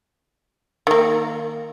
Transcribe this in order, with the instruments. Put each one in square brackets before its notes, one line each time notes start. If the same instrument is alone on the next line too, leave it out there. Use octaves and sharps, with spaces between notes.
[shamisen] D#3 A#3